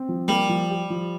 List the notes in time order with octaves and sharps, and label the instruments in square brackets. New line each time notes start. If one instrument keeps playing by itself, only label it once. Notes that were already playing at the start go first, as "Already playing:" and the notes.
Already playing: [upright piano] C4
F3
[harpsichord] G3 [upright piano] A#3
[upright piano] F3
G4
F3